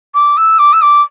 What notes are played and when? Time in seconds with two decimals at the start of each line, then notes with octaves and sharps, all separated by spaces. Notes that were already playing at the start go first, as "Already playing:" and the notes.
0.15 D6
0.37 E6
0.59 D6
0.73 E6
0.82 D6